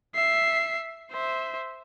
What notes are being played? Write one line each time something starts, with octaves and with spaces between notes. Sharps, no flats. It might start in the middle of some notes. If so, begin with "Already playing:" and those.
E5 C7
C5 E5